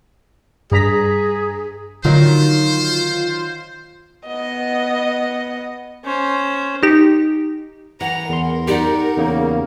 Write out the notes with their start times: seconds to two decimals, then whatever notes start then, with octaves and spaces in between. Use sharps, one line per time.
0.71 G2 G#4 A#5 B6
2.05 D3 D#3 F#3 D#4 F4 C5
4.27 B3 D#5
6.05 C#4 C5
6.83 D#4 G4
8.01 E3 F#5 A#5 F7
8.29 E2 A#4 C6
8.67 D#4 G4 D5 F#5
9.17 E2 C#3 A#3